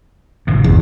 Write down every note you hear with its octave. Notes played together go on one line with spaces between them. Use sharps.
G1 A2 C3
E2